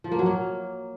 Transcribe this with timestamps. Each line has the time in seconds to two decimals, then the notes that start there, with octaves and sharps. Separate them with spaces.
0.04 F3
0.12 A#3
0.19 F#3
0.26 A#3